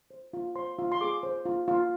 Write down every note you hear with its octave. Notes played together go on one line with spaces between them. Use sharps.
C5
F4
C5 C6
F4
C6
G#4 D6
C5
F4
F4